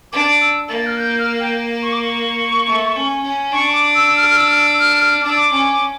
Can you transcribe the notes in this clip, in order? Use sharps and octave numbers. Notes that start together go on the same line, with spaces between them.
D4 D6
E6
A#3 A6
F6
G6
F6
G5
C#6
D6
C#6
A3
C#4
C#4
D4 C#6
D6
E6
F6
F6
E6
F6
E6
F6
F6
D4 D6
E6
D6
C#4